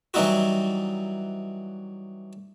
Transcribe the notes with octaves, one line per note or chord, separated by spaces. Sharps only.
E3 F#3 G3 D#4 E4 F#4